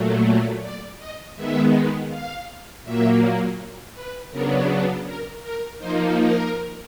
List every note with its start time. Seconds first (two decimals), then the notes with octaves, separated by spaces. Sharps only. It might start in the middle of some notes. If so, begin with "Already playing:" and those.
Already playing: A#2 F#3 A3
0.62 D5
0.98 D#5
1.36 D#3 G#3 B3 E5
2.09 F5
2.84 A#2 F#3 A#3 E5
3.95 B4
4.31 C#3 F#3 B3 D4 A#4
5.05 A#4
5.42 A#4
5.79 F3 A#3 D#4 C5
6.17 A#4